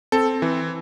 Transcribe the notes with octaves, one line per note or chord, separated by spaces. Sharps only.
C4 A4
E3